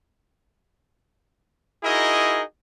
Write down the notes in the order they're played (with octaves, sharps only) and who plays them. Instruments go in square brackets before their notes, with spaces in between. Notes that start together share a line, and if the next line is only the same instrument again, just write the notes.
[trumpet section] D#4 E4 F#4 G#4 A#4 D#5